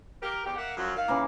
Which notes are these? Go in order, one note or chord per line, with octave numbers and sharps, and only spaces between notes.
G4 A#4
E2 G4
A#3 E5 F#5
F#2 F3 F#3
D#3 F5
C#3 E3 A#3